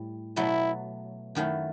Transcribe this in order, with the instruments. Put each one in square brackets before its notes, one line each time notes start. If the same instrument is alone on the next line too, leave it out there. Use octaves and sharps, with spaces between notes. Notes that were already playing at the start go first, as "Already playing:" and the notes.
Already playing: [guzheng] A2 G3
[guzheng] B2 F#3 A3 [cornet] E4
[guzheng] F#2 D#3 F#3 A3 E4